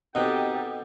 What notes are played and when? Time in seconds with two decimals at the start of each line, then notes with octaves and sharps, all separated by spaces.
0.15 B2 C4 D#4 G4 A4 F#5